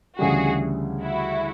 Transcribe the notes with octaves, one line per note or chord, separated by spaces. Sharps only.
D2 C#3 E3 G3 F#4 G#4
E4 F#4